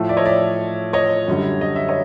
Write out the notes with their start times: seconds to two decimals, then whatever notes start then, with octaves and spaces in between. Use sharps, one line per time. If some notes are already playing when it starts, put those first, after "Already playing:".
Already playing: A2 F3 A3
0.09 D5 E5
0.17 C#5 D#5
0.25 D5 E5
0.93 C#5 D#5
1.28 F#2 D3 G3
1.61 D#5
1.76 E5
1.89 C#5 D#5